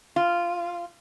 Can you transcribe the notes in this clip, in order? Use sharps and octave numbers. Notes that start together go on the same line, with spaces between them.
F4